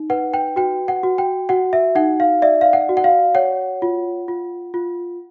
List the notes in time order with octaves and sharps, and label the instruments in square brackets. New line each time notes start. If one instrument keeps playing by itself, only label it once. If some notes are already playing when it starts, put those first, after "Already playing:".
Already playing: [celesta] D#4
B4 F#5
G5
F#4 G5
F#5
F#4
G5
F#4 F#5
E5
D#4 F#5
F5
D5 E5
F5
F#5
F#4
F#5
F5
C#5 F#5
F4
F4
F4